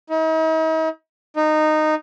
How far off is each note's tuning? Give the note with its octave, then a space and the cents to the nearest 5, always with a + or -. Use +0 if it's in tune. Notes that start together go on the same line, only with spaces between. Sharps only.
D#4 +45
D#4 -15